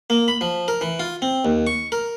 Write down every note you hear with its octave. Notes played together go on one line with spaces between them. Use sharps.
A#3
B5
F3
A#4
E3
F4
C4
D#2
C#6
A#4